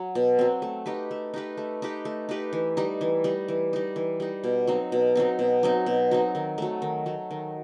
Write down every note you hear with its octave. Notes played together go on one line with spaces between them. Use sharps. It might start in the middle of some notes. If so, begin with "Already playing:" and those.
Already playing: F#3
B2
F#3 C4
A3
D#4 G4 B4
A3
D#4 G4 B4
A3
D#4 G4 B4
A3
D#4 G4 B4
E3
G3 D#4
E3
G3 D#4
E3
G3 D#4
E3
G3 D#4
B2
F#3 C4 D#4
B2
F#3 C4 D#4
B2
F#3 C4 D#4
B2
F#3 C4 D#4
D#3
F#3 A3
D#3
F#3 A3
D#3